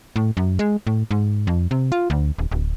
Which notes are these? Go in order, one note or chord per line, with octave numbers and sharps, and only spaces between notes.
A2
F#2
G#3
A2
G#2
F2
C3
F4
D2
D#1
D1